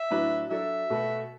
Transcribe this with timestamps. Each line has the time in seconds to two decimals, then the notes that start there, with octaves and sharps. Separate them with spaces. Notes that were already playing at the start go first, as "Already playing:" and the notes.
Already playing: E5
0.11 A2 F#3 D4 B4
0.50 F#3 D4 A4 D5 E5
0.90 B2 A3 F#4 B4